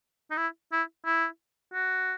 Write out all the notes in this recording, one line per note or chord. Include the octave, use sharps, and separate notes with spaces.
D#4
E4
E4
E4
F#4